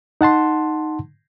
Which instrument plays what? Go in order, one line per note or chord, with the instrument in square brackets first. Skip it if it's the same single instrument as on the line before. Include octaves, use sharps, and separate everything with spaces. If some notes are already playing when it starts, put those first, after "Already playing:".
[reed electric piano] D#4 F#5 A5 C6